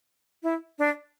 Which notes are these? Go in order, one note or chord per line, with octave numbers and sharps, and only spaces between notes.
E4
D4